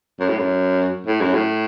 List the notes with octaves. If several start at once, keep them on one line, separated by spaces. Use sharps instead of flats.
F#2
A2
F#2
A2
F#2
A2